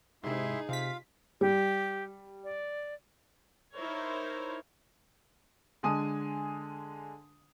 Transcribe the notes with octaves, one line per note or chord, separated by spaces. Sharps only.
G#2 C3 D#4 E4 G#4 E5 C6
C3 F4 F5 B6
G3 G4
D5
D#4 E4 A#4 C5 C#5
D3 G#3 G#5 A5 D#6 D#7